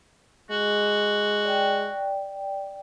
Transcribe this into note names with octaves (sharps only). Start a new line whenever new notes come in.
G#3 F#4
D5 G5